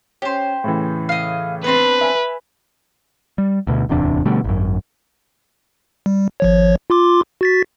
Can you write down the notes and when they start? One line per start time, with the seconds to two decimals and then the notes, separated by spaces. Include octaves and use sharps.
0.22 C#4 G4 C5
0.64 A2 C#3 E3
1.09 D#5 F5
1.64 B3 C4 D4 B4
2.01 E5 G#5
3.38 G3
3.67 D2 B2
3.89 D1 E2 C3 D4
4.25 B2 D3 G3 A3
4.44 G#1 F#2
6.06 G3
6.40 G#1 F3 C#5
6.90 F4 C6 D6
7.41 F#4 A6 B6